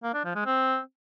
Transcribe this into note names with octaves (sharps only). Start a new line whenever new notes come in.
A#3
D4
F3
G#3
C4